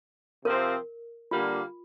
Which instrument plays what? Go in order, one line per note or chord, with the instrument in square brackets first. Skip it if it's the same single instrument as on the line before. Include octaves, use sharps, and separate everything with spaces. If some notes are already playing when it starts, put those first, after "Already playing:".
[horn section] C3 F3 C4 F4 [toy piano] A#4
[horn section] D3 G3 A#3 [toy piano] F4